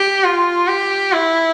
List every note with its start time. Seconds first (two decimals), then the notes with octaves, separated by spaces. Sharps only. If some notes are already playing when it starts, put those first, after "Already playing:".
Already playing: G4
0.24 F4
0.68 G4
1.13 E4